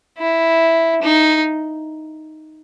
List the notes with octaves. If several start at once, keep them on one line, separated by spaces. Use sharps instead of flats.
E4
D#4